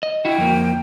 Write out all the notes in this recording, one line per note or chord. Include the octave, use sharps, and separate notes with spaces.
D#5
E4 F#4 G5
F2 A#3